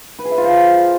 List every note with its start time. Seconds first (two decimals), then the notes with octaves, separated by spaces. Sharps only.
0.19 B4
0.25 G#4
0.31 E5
0.38 F4
0.44 C5